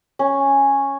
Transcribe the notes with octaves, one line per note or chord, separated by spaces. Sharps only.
C#4